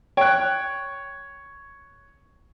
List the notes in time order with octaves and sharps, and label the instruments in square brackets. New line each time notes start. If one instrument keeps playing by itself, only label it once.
[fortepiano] C#5 F#6 [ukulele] G5